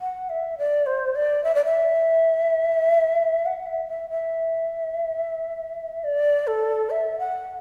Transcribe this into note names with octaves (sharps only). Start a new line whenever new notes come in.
F#5
E5
D5
C5
D5
E5
D5
E5
F#5
E5
E5
E5
D5
A4
E5
F#5